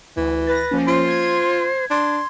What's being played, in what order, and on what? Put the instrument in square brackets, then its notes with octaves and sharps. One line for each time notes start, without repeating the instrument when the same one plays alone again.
[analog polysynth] D2 [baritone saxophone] E3
[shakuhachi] B4 [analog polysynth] A6 A#6
[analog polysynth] F3 A#3 C#4
[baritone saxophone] F4 [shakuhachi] C5
[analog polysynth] G#6
[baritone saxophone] D4 [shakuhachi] C6